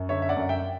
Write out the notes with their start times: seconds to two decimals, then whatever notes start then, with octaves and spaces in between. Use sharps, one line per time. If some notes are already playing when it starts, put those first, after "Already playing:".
Already playing: F#2
0.09 D3 C#5 E5
0.22 E5
0.29 D5 F#5
0.36 F#2
0.49 E5 G5